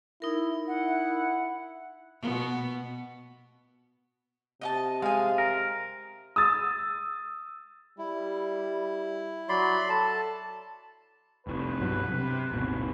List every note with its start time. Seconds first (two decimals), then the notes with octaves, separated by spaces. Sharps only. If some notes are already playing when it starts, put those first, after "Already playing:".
0.22 D#4 E4 A#4
0.68 E4 F#5
2.22 B2 B3
4.62 C3 D#5 F#5 A5
5.02 G#3 F5 G#5
5.38 A#4
6.36 D#6 E6 A6
7.98 G3 E4
9.49 F#3 D5 B5 C6
9.89 A4 A5
11.47 F1 C2 B4
11.81 G2 B2 F#3
12.12 C3
12.51 D#1 G#1 B2